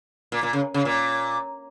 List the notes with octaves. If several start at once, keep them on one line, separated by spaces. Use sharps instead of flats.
A#2
A#2
C#3
C#3
A#2